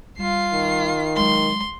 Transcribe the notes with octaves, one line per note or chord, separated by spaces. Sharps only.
G3 F4 C7
D#3
F#3 G#3 C6